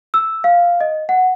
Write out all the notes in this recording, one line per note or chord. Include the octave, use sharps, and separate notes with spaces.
E6
F5
D#5
F#5